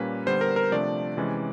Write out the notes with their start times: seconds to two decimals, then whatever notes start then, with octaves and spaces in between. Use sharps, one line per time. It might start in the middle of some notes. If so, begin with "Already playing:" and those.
Already playing: A#2 G3 A#3 C#4 B4
0.26 D3 G3 B3 C5
0.41 A#4
0.56 A#4
0.72 C3 F3 A3 D4 D5
1.17 C3 E3 G#3 C#4